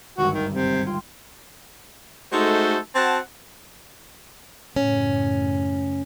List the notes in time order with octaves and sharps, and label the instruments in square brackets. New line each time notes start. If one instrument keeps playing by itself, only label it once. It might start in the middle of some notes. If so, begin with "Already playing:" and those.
[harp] G#1 D2 G2 [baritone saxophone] F#4
[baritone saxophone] D#3
C3
[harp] G#6 C7
F4 G5 C6
[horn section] G#3 A3 D#4 F#4 A4 C5
C4 F#4 F#5 A5
[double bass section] F#2 A2 C#3 [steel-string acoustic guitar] C#4